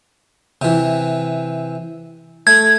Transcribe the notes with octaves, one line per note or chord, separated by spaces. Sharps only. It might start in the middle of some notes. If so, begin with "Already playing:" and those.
C3 E3
A3 G#6